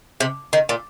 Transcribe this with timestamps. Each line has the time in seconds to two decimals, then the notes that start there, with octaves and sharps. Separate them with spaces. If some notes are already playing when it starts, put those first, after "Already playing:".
0.20 C3
0.53 D#3
0.69 A#2